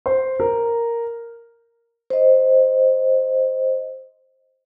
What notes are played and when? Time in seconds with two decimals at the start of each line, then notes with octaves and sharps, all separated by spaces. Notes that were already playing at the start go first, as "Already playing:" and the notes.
0.06 C5
0.40 A#4
2.10 C5 D#5